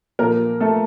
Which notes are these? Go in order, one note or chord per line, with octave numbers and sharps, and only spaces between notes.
A#2 F3 A#3 A#4
A3 A4